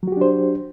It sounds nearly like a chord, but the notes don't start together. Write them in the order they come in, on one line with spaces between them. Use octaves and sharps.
F#3 F#4 G4 D4 C5